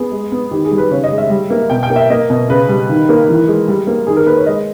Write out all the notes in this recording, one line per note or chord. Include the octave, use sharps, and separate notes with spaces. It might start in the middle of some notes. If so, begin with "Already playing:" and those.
Already playing: B3 G#4
G#3
B3
D#3 G4
G#4
G3
B4
C#3 C#5
D#5
G#3
E5
G3
A#3
B2 G5
G5
A#3
E5
A#3 D#5
B2
C#3 B4
G3
D#3
A#3
E3
G#3
G3
A#3
D#3 G#4
A#4
A#3 B4
C#5
G#3 D#5